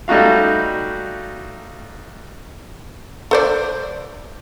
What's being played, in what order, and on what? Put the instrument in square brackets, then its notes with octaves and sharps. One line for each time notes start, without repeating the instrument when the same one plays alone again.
[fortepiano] G3 A3 D#4 F#4 F5
[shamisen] A4 C5 D5